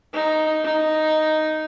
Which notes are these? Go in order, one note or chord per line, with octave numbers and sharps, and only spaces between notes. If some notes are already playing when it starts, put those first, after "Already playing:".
D#4
D#4